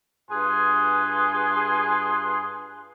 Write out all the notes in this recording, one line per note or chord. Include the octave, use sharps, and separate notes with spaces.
G2 F4 G#4 B4 G#5 C6